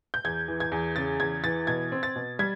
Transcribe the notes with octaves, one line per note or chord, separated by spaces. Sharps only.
G6
E2 G#6
E3
G#6
E2
C#3 A6
E2 G#6
E3 A6
B2 G#6
C4
A6
B2
G3 G#6